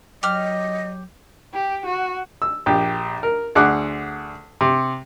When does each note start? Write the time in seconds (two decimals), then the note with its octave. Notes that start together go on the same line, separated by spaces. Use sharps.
0.23 F#3 G4 D#5 F6
1.53 G4
1.86 F#4
2.42 E6
2.66 A#1 G4
3.23 A#4
3.55 D2 G#4 F#5 D6 F#6
4.61 C3